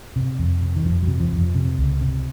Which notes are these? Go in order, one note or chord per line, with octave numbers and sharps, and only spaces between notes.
C3
F2
C3
D#3
F2 F3
F#3
C3
F3
F2 F3
C3
C#2
C3